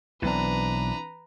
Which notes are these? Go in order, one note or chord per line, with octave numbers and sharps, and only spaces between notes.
B1 E3 C4 D4 B4 A#5